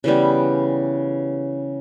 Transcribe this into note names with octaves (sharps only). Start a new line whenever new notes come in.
C#3 E3 G3 B3